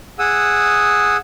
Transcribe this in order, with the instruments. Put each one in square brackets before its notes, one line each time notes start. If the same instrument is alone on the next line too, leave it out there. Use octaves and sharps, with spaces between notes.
[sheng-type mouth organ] G#4 F#5 D#6 E6